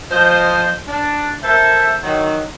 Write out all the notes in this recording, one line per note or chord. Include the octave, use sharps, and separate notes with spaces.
F3 C5 D#5
D4
A4 A#4 C5 E5
D#3 F#3